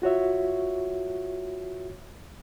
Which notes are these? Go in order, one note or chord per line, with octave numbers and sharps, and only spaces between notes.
F4 F#4 C#5 E5